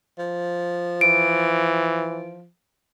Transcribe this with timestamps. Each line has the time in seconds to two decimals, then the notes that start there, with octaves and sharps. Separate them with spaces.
0.19 F3
1.01 E3 D7